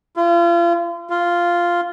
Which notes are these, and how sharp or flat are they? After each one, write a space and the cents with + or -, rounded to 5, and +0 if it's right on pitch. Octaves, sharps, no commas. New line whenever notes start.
F4 -35
F4 -5